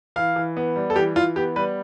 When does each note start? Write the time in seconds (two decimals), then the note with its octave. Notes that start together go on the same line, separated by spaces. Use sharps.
0.16 E3 F5
0.36 E3
0.57 B3
0.76 G3
0.90 A4
0.96 E3 G4
1.16 E3 F4
1.36 B3 G4
1.56 G3 B4